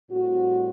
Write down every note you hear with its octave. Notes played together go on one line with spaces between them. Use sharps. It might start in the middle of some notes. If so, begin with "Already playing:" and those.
A2 G3 C4 F#4